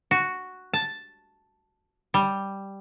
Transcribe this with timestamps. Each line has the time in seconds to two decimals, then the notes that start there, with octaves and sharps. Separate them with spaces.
0.11 F#4
0.73 A5
2.14 G3